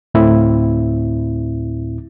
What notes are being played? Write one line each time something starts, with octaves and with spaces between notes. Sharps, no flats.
D2 A2 C4 E4